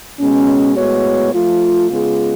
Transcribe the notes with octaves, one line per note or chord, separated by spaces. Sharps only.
B2 G#3 C#4
A2 G#3 B3 F#4 C#5
F3 A3 F4
C#3 G#3 B3 F4 G#4